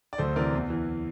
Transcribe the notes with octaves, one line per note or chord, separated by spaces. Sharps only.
D5
D2 A4 C5
C3 E3 A#4 D5
E2
E3